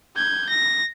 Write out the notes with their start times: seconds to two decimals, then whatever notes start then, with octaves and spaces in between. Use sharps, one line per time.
0.16 G6 G#6
0.50 A#6